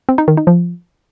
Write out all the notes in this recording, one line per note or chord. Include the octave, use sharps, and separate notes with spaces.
C4
D#4
D#3
D#4
F3